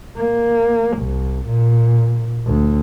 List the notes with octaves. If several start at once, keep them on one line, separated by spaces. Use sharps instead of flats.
A#3
C2
A#2
D2